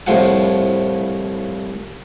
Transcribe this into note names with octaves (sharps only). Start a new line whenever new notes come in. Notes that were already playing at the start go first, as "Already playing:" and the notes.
C2 A2 F3 F#5